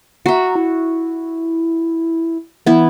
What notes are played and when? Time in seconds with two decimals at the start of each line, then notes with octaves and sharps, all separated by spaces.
0.26 F#4 E5 A#5
0.55 E4
2.66 E3 B3 E4